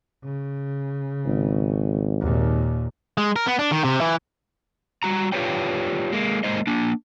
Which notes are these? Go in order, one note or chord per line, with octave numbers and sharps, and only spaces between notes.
C#3
G#1
D#2 A#2
G#3
A#4
B3
D4
D#3
C3
E3
G3 F#4 A#5
F4 G4 B4 C#5 D5 G5
G#3 A#3
G#3 A#3 C5 D#5
A#3 D4